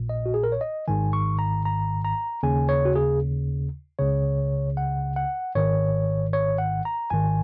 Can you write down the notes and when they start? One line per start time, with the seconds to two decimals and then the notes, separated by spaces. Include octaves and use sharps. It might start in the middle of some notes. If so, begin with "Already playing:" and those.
Already playing: A#1 A#2
0.09 D#5
0.26 F#4
0.34 G#4
0.43 A#4
0.52 C#5
0.61 D#5
0.88 G#1 G#2 D#3 G#5
1.13 C#6
1.39 A#5
1.65 A#5
2.05 A#5
2.43 D#2 C#3 G#5
2.69 C#5
2.85 F#4
2.95 G#4
3.99 C#2 C#3 C#5
4.77 F#5
5.16 F#5
5.55 G#1 G#2 D#3 C#5
6.33 C#5
6.58 F#5
6.85 A#5
7.10 G#1 G#2 D#3 G#5